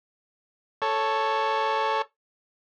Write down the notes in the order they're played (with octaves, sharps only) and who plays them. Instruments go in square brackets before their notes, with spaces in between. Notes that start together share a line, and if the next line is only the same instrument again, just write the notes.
[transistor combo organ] A4 C#5